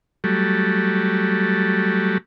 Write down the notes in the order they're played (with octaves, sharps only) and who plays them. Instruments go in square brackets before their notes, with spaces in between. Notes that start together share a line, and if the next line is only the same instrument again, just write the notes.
[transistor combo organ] F#3 G3 A3